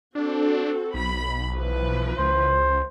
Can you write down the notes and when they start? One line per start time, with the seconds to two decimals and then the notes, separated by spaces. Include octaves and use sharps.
0.15 C4 D4 F#4 A4
0.94 B1 B5
1.53 E3 F3 B4
2.19 C#2 C5